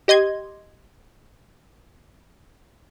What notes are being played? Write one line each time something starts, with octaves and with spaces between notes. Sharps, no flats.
G4 D#5 C6 G#6